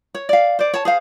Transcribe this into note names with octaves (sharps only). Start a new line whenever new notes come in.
C#5
D5 F5
C5 D5
C#5 A5
G#4 C5 F5